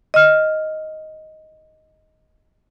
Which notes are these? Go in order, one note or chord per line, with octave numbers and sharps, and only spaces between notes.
D#5 F6